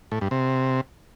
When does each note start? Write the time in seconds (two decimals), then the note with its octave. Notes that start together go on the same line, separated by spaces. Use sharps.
0.12 A2
0.21 G2
0.31 C3